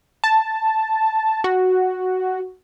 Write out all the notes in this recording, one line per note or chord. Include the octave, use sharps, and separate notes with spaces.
A5
F#4